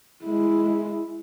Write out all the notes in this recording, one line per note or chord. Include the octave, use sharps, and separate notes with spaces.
G#3 E4